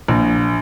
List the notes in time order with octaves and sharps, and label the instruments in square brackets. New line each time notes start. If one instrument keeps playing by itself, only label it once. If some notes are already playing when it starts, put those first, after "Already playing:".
[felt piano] A#1